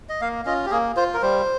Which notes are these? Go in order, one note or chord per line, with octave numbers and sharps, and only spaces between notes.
D#5
A#3 F5
C#4 F4 D#5
G4
A#3 G#4
F4 C5
A#4
G3 C5